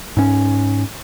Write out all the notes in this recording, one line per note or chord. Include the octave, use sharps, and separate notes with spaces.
G#2 C#4